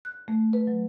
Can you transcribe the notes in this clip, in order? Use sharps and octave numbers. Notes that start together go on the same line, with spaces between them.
F#6
A3
B4
F#3